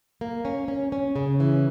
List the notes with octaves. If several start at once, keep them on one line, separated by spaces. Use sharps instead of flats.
A#3
C#4
C#4
C#4
C#3
E3